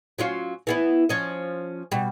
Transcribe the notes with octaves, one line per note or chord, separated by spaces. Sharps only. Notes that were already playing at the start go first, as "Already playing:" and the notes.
F#3 C#4 F4
E3 B3 E4
F3 C#4 D#5
B2 G3